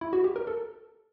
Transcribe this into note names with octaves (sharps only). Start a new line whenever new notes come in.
E4
F#4
G4
A#4
A4